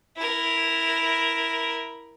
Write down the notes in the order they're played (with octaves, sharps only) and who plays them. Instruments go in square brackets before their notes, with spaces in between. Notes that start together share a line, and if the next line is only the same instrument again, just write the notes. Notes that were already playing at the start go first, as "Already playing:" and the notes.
[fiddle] E4 A#4